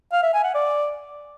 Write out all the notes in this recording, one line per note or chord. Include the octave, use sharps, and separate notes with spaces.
F5
E5
G#5
F#5
D5